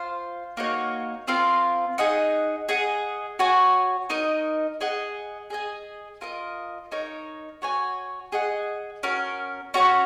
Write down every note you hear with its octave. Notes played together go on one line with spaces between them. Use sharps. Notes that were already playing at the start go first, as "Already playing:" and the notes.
Already playing: F4 C5 F5
A#3 D#4 F#4 C#5
C4 F4 A#4 F5
D#4 G#4 D#5 F#5
G#4 D#5 F#5
F#4 C#5 G#5
D#4 A#4 D#5
G#4 D#5 F#5
G#4 D#5 G#5
F4 A#4 D#5
D#4 A#4 C#5
F#4 C#5 G#5
G#4 D#5 F#5
C#4 F#4 A#4
C#4 F#4 C#5